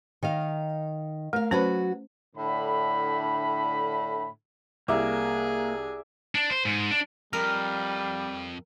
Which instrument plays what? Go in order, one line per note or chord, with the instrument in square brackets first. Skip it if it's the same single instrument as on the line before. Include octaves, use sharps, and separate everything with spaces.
[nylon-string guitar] D#3 D#5 F5
[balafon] A3 [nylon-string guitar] A#4 F5
[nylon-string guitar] F#3 F#4 B4 [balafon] C#4 C5
[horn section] A2 D3 B5
[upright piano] C2 [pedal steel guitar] A#3 [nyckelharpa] G#4 [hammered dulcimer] D5 E5
[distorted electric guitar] D4
C5
G#2
D4
[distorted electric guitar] F2 [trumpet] G3 [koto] A#4 [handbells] F6